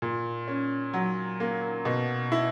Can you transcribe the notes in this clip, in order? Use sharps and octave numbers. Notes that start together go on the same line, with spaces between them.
A#2
C#4
F#3
A#3
B2
E4